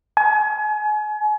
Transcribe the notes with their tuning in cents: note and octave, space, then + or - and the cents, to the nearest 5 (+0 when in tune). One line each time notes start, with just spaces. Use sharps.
G#5 +35